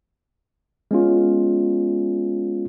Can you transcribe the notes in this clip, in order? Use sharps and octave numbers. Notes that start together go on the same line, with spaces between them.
G#3 B3 C#4 F4